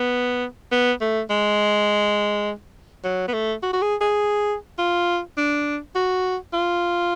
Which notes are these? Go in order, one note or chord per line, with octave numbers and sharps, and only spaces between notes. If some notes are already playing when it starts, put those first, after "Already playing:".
Already playing: B3
B3
A3
G#3
F#3
B3
A3
F#4
F#4
G#4
G#4
F4
D4
F#4
F4